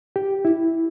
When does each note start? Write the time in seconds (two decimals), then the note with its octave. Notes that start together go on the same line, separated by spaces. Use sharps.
0.16 G4
0.45 E4